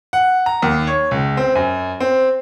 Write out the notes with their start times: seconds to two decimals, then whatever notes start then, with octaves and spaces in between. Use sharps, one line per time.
0.13 F#5
0.46 A#5
0.62 D#2
0.87 C#5
1.11 C#2
1.37 C4
1.55 F#2
2.00 C4